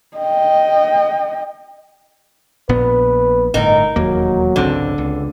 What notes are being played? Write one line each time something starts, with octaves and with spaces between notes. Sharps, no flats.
D#5 G5
A#1 A#2 B3 B4
G1 A2 D#4 A#4
E1 D#2 F#3 A#3
G#1 C#2 D3 C4
C#2